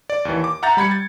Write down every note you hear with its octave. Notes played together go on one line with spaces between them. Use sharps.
D5
D#2 E3
D6
E5 F#5 A#5 G6 A6
G3 B5 G#6 C#7
A6